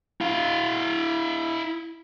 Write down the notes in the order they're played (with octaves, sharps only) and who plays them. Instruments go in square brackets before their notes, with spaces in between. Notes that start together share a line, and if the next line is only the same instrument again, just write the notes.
[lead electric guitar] E4 F5